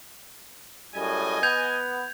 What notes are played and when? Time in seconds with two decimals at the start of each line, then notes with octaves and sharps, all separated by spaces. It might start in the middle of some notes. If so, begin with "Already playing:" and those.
0.95 F#2 A2 G3 D#5 G#5
1.43 B3 G6 G#6 F7